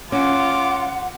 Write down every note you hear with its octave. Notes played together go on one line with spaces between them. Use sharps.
C#4 F4 F#5 D6